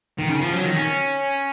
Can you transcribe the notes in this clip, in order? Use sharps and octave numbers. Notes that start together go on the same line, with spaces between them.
D#3
C#3
F3
F#3
D#3
C#4